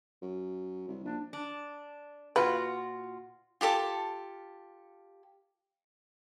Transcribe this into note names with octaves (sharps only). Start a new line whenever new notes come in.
F#2
C2
A#1 D4
D4
A#2 F4 F#4 B4
F4 G4 A4 A5